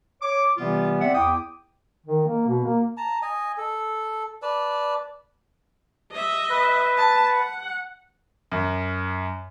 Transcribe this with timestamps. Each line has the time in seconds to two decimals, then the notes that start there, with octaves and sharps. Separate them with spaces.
0.22 C#5 D6
0.57 C3 E3 G3 B3 F4
1.01 C4 D5 E5 F#5
1.15 E2 E4 G5 D6 D#6
2.06 D#3
2.26 A#3
2.47 B2
2.64 A#3
2.97 A5 A#5
3.22 D#5 G#5
3.57 A4
4.42 B4 D5 A5
6.11 D#5 E5
6.50 B4
6.97 A5
7.31 F#5
8.52 F#2